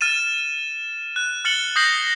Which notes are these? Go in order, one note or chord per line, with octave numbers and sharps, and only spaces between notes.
F6 A6 D#7 E7
F#6
F6 A6 C#7 F#7 G7
D#6 G6 A#6 C7 F#7